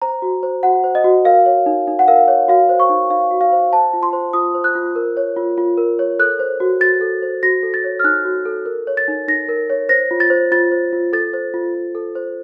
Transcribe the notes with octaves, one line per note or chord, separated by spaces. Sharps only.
C5 A#5
F#4
C5
F#4 F#5
C5
D#5
F#4
A#4 F5
C#5
D#4
D#4
F#5
A#4 F5
C#5
F#4 F5
C5
C#6
D#4
D#4 F5
F#4
F5
C5
C5 A5
F4
C6
C5
F4 D#6
C5
F#6
F4
A#4
C#5
F4
F4
A#4
C#5
A4 F#6
C5
F#4
F#4 A6
A4
C5
F#4 A#6
A4
A6
C#5
F6
D#4 F#6
F#4
A4
A#4
C#5
A6
D#4
D#4 A#6
A#4
C#5
C5 A#6
F4
A6
C5
F4 A6
C5
F4
A4 A6
C5
F4
F4
A4
C5